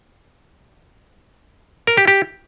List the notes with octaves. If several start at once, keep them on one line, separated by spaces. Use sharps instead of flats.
A#4
G4
G4